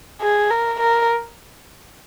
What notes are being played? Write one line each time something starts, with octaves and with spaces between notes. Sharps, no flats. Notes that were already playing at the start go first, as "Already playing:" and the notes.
G#4
A#4
A#4